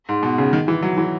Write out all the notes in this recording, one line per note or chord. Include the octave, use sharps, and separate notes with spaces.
G#2
B2
C#3
D#3
E3
F#3
E3